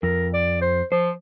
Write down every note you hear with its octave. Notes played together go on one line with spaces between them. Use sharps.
F2 A#4
D5
C5
F3 C5